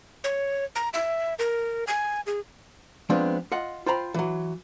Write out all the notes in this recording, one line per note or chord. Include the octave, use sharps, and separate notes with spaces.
C#5
A#5
E5
A#4
G#5
G#4
F3 G#3 B3 C4 D4
F4 D#5 F#5
F4 C5 G5 A#5 B5
E3 F#3